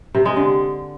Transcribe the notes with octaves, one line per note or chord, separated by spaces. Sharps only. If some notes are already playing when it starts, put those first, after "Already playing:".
C3
G#3
D3